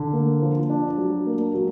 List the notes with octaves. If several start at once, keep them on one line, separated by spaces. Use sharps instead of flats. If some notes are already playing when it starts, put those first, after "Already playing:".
Already playing: D3
A#3
F3
D4
F#3
A#3
F#3